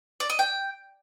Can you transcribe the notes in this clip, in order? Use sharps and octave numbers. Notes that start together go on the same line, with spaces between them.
D5
D#5
G5